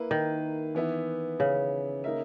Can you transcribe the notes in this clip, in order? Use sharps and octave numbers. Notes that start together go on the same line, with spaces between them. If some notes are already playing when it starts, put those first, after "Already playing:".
Already playing: A#3 E4 B4
D#3
E3 B3 E4
C#3
A#3 D#4 A#4 E5